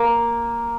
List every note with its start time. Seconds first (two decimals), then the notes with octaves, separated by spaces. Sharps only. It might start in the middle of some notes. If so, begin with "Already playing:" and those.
Already playing: A#3